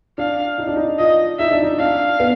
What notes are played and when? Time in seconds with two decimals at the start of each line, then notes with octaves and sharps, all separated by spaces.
0.18 D4 F5
0.58 D#4
0.67 D4
0.76 D#4
0.98 F4 D#5
1.39 D#4 E5
1.51 D4
1.62 D#4
1.79 D4 F5
2.20 B3